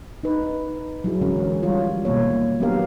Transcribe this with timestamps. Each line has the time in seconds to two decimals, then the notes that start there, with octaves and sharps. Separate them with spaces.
0.24 D#4 B4
1.04 F#3 E4 G#4
1.21 D3 E3 G#3 C#4 A#4
1.63 G3 F4 C#5
2.05 B2 D#3 A#3 C#5
2.60 F#3 B3 D4 G4 A#4 F5